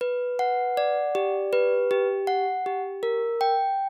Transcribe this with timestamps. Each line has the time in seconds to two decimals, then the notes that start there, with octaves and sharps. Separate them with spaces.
0.01 B4
0.39 F#5
0.77 D5
1.15 G4
1.53 B4
1.91 G4
2.27 F#5
2.66 G4
3.03 A#4
3.41 G5